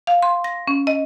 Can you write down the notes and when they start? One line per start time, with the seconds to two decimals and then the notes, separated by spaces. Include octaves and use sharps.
0.07 F5
0.22 C6
0.44 A#6
0.68 C#4
0.87 D#5